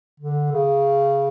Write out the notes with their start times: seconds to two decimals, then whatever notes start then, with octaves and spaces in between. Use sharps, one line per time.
0.20 D3
0.52 C#3